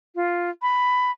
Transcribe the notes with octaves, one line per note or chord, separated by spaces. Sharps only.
F4
B5